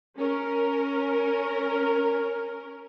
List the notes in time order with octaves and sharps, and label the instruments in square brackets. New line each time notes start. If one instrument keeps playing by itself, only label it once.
[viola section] C#4 A#4